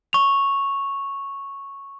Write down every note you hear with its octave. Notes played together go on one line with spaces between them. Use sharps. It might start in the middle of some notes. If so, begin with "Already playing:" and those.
C#6 F7